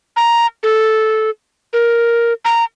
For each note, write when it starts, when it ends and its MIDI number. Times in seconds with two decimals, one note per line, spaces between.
0.16 0.47 82
0.63 1.30 69
1.73 2.33 70
2.45 2.64 82